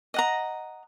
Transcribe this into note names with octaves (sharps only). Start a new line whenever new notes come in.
D#5 F#5 A#5